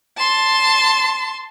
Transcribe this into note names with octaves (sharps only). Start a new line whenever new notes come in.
A5 C6